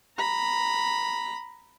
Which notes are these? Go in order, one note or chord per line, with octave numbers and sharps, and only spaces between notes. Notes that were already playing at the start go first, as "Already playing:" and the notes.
A#5 B5